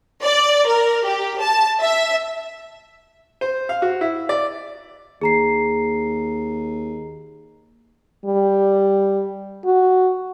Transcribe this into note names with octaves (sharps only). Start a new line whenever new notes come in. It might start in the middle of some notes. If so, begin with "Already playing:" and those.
D5
A#4
G4
A5
E5
C5
F5
F#4
E4
D5
D#2 G#4 A#5 C7
G3
F#4